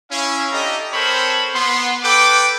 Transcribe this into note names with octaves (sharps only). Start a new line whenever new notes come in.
C#4 E4 F5
D4 G4 A4 D#5 A#5
C4 A4 A#4 C5 C#5 B5
B3 C6
A4 B4 G5 D6